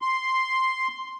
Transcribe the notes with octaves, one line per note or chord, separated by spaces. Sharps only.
C6